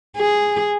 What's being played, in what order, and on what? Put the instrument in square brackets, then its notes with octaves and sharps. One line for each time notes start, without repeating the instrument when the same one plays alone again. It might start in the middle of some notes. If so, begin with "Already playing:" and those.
[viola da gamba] G#4